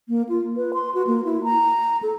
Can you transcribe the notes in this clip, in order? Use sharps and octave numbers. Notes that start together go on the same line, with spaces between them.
A#3
F4
B4
C6
F#4
A#3
E4
A#5
A4